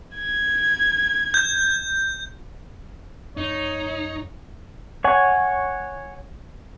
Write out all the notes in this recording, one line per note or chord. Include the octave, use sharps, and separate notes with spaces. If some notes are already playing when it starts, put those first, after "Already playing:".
G#6
G6
F#2 D#4 C#5
C#5 F#5 G#5